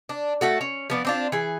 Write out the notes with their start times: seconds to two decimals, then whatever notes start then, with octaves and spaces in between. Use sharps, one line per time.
0.09 D4
0.41 A3 F#4 A4
0.61 C#4
0.90 F3 B3 D4
1.05 C4 D4 F4
1.32 E3 G#4